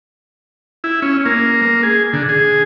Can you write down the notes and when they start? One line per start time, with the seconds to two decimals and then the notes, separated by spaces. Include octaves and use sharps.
0.84 E4
1.02 C#4
1.26 A#3
1.62 A#3
1.83 G#4
2.13 D3
2.29 G#4